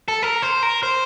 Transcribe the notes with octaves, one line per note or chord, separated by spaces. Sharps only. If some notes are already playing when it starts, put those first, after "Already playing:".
A4
A#4
C5
A#4
C5